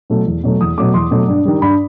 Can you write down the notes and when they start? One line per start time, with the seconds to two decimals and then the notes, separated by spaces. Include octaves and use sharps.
0.10 B2 F#3 A3
0.26 E2
0.44 B2 F#3 A3
0.61 E2 D#6
0.78 B2 F#3 A3 D6
0.94 E2 C6
1.11 B2 F#3 A3
1.28 G2
1.45 D#3 G3
1.62 G2 B5